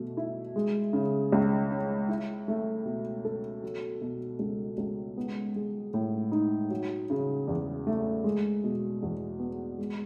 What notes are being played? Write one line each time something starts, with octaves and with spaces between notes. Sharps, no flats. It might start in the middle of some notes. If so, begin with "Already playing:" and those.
Already playing: B2 A3
E4
G#3
C#3
C#2
C#4
E4
A3
B2
A4
F#3
B2
C#2
C#2
B3
G#3
A2
D#4
F#3
C#3
E2
A3
G#3
B2
E2
B3
G#3